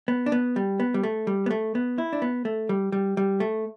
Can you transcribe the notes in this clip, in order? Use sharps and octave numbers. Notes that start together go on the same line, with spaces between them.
B3
D4
B3
G3
B3
G3
A3
G3
B3
A3
B3
E4
D4
B3
A3
G3
G3
G3
A3